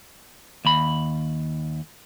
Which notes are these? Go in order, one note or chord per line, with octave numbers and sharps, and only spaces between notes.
D#2 B5